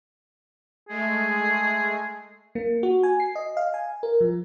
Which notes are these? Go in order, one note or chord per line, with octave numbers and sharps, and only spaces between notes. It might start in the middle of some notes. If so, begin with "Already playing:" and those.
G#3 A3 G#4
A#3
F#4
G#5
C7
D#5
F5
G#5
A#4
F3